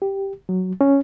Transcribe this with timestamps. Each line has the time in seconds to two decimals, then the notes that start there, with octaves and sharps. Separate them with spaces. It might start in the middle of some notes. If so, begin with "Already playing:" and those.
0.02 G4
0.49 F#3
0.81 C#4